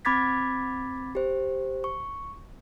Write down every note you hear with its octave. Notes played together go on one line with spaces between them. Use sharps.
C4 B5 D6 G#6 A6 B6
G4 C5
C#6